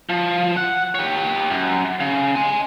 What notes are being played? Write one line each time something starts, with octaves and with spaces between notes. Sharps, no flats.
F3
F#5
G4 C#5
F#2
C#3
G#5 C6